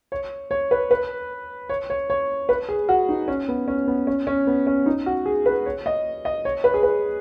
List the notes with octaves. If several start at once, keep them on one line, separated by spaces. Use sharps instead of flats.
C#5
C#5
B4
B4
C#5
C#5
C#5
B4
G#4
F#4
D#4
C#4
B3
C#4
B3
C#4
C#4
B3
C#4
D#4
F#4
G#4
B4
C#5
D#5
D#5
C#5
B4
G#4
B4